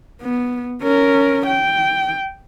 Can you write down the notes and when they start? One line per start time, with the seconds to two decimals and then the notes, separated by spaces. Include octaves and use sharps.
0.22 B3
0.83 C#4 A#4
1.47 G5